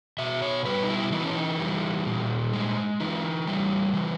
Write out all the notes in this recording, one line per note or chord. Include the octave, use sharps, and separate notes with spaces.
B2 E5
C#5
G3 B4
D#4
E4
E3 D#4
C#4
D#4
G3
A#2
G#3
E3 D#4
G3
E3